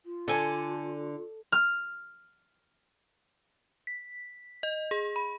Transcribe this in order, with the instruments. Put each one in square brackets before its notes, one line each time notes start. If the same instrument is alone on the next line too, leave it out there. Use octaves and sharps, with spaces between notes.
[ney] F4
[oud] D3 [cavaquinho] A4 G#5 A5
[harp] F6
[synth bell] B6
D#5
G#4
B5